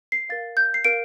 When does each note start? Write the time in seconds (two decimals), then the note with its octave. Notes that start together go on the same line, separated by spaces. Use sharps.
0.12 C7
0.29 A#4 F5 A6
0.57 G6
0.74 C7
0.84 A#4 F5 D7